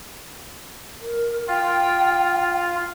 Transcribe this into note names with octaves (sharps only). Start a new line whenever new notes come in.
A#4
F4 G5